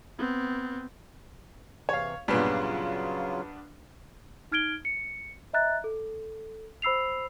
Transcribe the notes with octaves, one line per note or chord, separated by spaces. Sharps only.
B3 C4
C3 E3 C#5 F5
G2 A#2 C#3 F#3 B3 D4 F4
D#4 F6 G#6 D7 G7
C#7
D#5 E5 A#5 F#6 A6
A4
C5 B5 E6 C7 F7